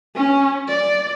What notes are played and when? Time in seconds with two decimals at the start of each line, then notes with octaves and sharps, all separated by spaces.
0.15 C#4
0.68 D5